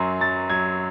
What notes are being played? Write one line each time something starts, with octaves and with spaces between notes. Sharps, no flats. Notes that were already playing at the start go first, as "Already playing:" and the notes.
Already playing: F#2 F#3 C6
F#3 A6
F#3 G#6